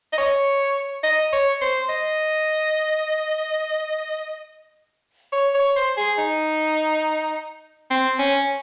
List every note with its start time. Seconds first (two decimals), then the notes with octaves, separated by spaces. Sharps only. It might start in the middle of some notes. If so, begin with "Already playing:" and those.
0.13 D#5
0.18 C#5
1.03 D#5
1.33 C#5
1.61 C5
1.89 D#5
5.33 C#5
5.55 C#5
5.76 C5
5.97 G#4
6.18 D#4
7.91 C4
8.19 C#4